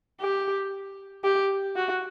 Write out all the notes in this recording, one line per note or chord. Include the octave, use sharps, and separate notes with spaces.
G4
G4
F#4